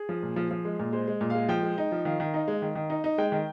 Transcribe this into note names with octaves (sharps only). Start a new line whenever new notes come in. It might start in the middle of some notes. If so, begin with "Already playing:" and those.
Already playing: G#4
F3
A#2
F3
F3
G#3
A#2
G#3 C5
G#3
A#2
G#3 F5
F3 G5
G#3
D#4
F3
D#3 F5
D#3
D#4
G#3
D#3
D#3
D#4
D#4
G#3 G5
D#3